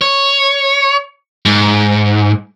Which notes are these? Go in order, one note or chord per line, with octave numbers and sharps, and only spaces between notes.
C#5
G#2